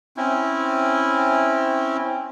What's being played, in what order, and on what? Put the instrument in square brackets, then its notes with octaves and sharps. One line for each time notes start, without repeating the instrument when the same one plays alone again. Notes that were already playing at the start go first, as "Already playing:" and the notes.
[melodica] C4 C#4 E4